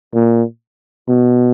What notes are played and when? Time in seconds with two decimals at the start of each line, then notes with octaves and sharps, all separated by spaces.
0.15 A#2
1.09 B2